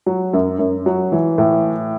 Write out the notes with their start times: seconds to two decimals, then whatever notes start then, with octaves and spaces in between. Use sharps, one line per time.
0.06 F#3
0.33 F#2
0.59 F#2
0.86 F#3
1.12 E3
1.38 A2